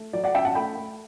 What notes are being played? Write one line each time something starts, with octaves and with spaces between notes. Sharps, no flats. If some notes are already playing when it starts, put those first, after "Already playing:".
Already playing: A3
F#3 D5
D5 F#5
C#4 E5 G5
F#5 A5
A3 G5 B5
A3